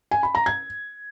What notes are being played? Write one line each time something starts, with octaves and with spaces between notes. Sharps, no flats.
G#5
B5
A#5
G#6